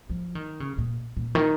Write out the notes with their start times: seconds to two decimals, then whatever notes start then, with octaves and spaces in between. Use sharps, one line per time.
0.10 F3
0.35 D#3
0.60 C#3
0.78 A#2
1.17 A#2
1.35 D#3